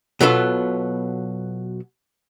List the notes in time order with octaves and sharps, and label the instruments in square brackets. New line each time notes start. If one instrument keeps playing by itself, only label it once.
[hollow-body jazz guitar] B2 F#3 B3 F4 A4